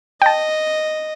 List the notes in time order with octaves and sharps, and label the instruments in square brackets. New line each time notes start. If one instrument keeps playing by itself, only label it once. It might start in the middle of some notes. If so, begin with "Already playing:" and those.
[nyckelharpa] D#5 [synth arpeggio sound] G5 A5